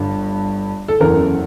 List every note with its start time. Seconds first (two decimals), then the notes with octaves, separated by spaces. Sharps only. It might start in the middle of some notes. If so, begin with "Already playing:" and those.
Already playing: G1 G2
0.88 A4
1.00 F#1 E2 C#3 E3 A#4